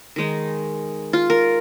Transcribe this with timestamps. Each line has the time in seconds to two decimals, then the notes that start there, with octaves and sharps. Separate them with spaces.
0.16 D#3 G#3 D#4
1.13 F4
1.30 A#4